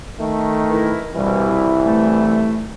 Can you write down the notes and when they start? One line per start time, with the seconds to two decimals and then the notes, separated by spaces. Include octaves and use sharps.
0.20 D#3 A3
0.70 E3 E4 A#4
1.14 C2 G2 B2 E3 G3
1.85 A3